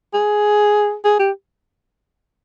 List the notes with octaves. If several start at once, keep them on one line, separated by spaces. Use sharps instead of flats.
G#4
G#4
G4